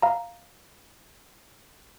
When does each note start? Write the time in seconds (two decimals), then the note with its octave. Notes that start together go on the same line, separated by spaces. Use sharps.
0.02 F5 A#5